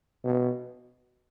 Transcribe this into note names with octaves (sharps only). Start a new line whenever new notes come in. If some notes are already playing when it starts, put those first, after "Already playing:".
B2